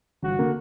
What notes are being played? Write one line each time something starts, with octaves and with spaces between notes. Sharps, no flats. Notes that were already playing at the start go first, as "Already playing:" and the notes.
G1 F#4
D3 A#3